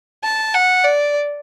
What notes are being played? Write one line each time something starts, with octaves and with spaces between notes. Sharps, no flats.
A5
F#5
D5